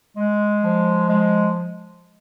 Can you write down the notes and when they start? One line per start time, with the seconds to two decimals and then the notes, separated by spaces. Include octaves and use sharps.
0.17 G#3
0.62 F3
1.08 G#3